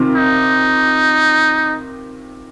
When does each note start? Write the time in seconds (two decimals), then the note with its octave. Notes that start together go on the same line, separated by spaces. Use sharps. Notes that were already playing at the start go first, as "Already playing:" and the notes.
Already playing: C3 D#3 C4 F4 A#4
0.15 D#4